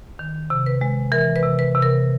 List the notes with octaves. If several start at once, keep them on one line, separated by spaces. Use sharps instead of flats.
D#3
C3
B4
G#3
E3 A#4
B4
C3
B4
C3
A#4